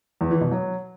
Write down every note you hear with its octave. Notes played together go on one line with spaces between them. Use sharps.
E2
E3
B2
F#3